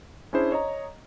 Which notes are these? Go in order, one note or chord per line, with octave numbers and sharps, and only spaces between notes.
C#4 D4 E4 G#4 C5
C#5 D#5 A#5